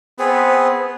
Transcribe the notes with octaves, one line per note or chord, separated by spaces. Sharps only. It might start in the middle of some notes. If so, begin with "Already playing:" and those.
B3 C4 G#4 C5